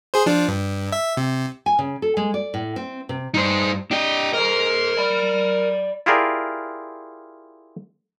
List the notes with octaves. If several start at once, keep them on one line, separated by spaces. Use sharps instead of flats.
G#4 C5
F3 D4
G2
E5
C3
G#5
C#3
A4
G#3
D5
A2
C4
C3
G2 D#4 C5
D4 G4 D#5
A#4 C5 D#5
D5 B5
E4 F4 G4 G#4 A#4 D5